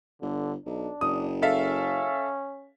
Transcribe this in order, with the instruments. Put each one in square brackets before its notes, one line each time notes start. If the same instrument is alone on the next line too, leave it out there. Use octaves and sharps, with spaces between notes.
[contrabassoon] G1 [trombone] D3
[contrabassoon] B1 [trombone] D4
[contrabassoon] F#1 [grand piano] D#6
[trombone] C#4 [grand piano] A4 E5 F5